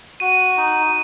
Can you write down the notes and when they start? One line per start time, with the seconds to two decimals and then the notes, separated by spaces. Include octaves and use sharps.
0.20 F#4 D#7
0.57 D#4